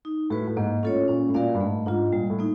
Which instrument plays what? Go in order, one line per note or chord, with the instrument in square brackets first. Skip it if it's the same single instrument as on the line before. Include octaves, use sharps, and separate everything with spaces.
[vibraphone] D#4
[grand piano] A2 [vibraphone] F#4 B4
[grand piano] A2
[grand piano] G#2 [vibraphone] A#3
[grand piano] A2 [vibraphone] C#4 F4 A4 C#5
[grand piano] A#2 [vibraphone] C#4
[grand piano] A2
[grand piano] A#2 [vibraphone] F#4 A#4 D5 F5
[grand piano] G2
[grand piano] G#2 [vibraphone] A3
[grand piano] G#2 [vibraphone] D4 F4
[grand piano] A#2 [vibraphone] G3
[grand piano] A2
[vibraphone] A#3 D#4